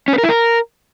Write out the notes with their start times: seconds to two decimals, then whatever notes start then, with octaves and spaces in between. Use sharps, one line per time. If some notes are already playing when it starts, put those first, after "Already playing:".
0.08 C#4
0.13 B4
0.18 A#4
0.24 E4
0.29 A#4